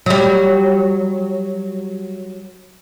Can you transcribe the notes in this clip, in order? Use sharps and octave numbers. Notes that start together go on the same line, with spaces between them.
F#3 G3